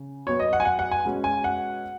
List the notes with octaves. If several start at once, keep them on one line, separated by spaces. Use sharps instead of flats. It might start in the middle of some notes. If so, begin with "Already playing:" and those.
Already playing: C#3
B2 F#3 B3 C#5
D#5
F#5
G#5
F#5
F#5
G#5
B2 G#3 C#4
G#5
F#5